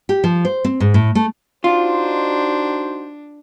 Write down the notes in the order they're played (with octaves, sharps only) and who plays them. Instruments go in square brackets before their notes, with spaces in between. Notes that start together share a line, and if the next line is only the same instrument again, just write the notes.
[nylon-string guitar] G4
F3
C5
C4
G#2
A2
A3
[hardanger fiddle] D4 [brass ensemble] D#4 F#4 C5 [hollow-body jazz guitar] F4